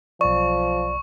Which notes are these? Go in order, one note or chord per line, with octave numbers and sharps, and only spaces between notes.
B1 F3 D5 C#6